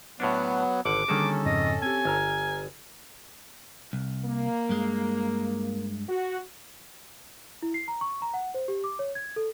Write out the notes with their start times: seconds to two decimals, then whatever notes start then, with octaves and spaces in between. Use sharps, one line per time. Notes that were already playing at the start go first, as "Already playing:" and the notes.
0.20 A2 F#3 B3 C#4 D4
0.85 G#1 D3 F#5 D6
1.08 D3 D#3 G3 A#3 C#4 F#4 G#4 A4
1.46 F2 G#2 C#3 D#5
1.83 C4 G4 G#5
2.05 G1 A#5 F6 G#6
3.93 C2
4.26 A#3
4.69 G2 G#3
6.08 F#4
7.62 E4
7.74 C7
7.88 A#5
8.01 C#6
8.22 A#5
8.34 F#5
8.54 C5
8.68 G4
8.84 D6
8.99 C#5
9.15 G#6
9.36 A4